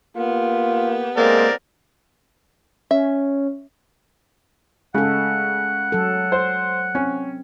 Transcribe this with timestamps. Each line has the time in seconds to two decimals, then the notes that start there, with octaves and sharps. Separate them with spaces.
0.16 A#3 B3 F4 G4
1.17 G#3 A#3 C4 A#4 D5
2.91 C#4 E5
4.95 C#3 G#3 A4 F#5
5.92 F#3 A4
6.32 C5
6.95 C4 C#4